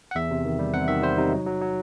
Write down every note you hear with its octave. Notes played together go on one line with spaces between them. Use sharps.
F#5
E2 E5
C3
D#3
G3
C3 F#5
D#3 E5
G3 C5
C3 D#4
F#3
F#3
F#3